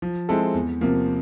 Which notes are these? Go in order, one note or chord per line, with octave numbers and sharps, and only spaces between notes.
F3
G#3 C4 E4 A4
E2
C3 F3 A#3